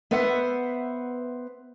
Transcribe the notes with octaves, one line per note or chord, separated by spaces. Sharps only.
B3 B4 C5 E5 F#5